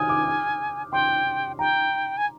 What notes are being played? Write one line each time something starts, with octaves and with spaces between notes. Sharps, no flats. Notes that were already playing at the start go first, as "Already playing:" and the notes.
Already playing: G#5 D#6 F6 G6
D6
G5 C6
G5 A#5
G#5